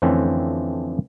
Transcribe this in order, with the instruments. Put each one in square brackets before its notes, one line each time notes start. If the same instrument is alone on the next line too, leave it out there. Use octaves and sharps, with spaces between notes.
[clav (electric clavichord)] F2 D3 E3 A3 C4 C#4